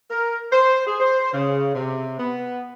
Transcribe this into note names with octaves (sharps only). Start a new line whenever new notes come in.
A#4
C5
G#4
C5
C#3
C3
B3